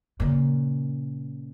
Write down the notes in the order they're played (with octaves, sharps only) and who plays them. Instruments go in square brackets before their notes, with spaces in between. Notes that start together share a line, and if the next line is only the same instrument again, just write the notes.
[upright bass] A#2 C#3